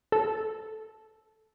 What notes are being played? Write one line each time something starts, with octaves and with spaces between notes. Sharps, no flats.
A4